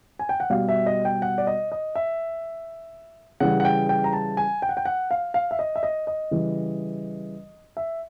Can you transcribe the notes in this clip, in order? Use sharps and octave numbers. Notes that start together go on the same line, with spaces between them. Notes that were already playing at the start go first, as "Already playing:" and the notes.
G#5
G5
F#5
B2 G3 F5
E5
D#5
G5
F#5
D5
D#5
D#5
E5
C#3 E3 G3 F#5
F#5
G5
G5
A#5
A5
G#5
G5
F#5
G5
F#5
F5
F5
E5
D#5
E5
D#5
D#5
C#3 E3 G3
E5